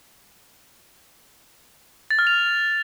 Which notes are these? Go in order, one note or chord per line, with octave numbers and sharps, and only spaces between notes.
A6
F6
F7